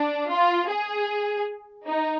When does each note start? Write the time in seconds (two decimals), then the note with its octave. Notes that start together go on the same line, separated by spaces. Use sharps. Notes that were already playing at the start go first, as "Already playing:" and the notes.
Already playing: D4
0.29 F4
0.69 G#4
1.86 D#4